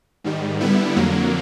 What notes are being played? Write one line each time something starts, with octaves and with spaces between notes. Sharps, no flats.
G#2 D#3 G3
D3 G3 B3 E4
F2 D3 F#3 A#3